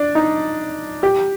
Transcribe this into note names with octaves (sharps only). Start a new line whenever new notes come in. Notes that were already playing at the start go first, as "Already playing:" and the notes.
Already playing: D4
D#4
G4